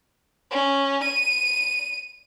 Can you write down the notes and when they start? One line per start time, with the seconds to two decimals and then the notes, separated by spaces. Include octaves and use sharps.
0.51 C#4
1.04 D#7